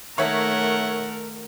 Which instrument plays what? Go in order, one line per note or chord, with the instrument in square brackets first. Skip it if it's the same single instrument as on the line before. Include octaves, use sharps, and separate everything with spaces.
[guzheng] D#3 A#3 A4 [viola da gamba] A3 A#4 [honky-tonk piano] C#5 E5 [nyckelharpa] F#5